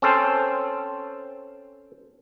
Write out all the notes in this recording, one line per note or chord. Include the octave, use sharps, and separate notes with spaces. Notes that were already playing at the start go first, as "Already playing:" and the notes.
C4 C#4 A4 C5